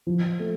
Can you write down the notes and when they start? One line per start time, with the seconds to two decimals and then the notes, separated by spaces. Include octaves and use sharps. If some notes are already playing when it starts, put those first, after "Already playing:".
0.07 F3
0.40 A3